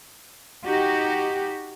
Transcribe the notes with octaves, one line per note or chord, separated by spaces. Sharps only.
D#4 F#4 G4